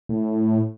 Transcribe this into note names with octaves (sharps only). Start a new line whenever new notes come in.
A2